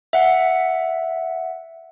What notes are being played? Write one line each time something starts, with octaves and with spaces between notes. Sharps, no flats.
E5 F#5